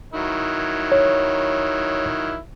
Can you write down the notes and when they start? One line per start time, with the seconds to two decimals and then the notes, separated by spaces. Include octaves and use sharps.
0.13 D#3 F#3 E4
0.92 C#5